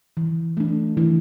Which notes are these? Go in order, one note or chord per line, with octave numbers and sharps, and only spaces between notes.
E3
A3 D4
E3